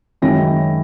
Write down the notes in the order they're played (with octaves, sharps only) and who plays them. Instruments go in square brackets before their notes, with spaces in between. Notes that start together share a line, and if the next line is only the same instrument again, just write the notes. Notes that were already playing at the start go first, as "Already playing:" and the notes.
[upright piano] F#2 D#3 G#3 C#4 E4 A#6